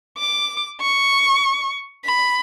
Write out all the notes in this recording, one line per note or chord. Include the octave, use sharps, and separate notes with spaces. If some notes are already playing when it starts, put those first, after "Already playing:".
D6
C#6
B5